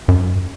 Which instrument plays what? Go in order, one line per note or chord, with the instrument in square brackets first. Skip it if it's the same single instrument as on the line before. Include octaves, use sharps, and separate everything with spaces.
[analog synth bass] F#2